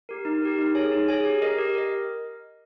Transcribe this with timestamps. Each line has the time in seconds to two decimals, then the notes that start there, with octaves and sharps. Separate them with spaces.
0.09 G4 A#4
0.25 D#4
0.42 G4 A#4
0.58 D#4
0.75 G#4 C#5 G#5
0.92 D#4
1.08 G#4 C#5 G#5
1.25 G4
1.42 A#4 D#5
1.58 G4
1.75 A#4 D#5